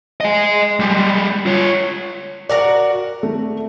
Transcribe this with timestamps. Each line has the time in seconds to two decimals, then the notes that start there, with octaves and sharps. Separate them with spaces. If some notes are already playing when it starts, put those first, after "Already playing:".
0.21 D#5 G#5
0.80 G3 G#3
1.46 F4 C#5
2.49 F#4 A#4 D5 F#5
3.23 A3